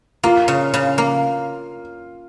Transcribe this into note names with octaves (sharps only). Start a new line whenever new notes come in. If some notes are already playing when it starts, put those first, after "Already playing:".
A#3 F4
C#3
C#3
A#3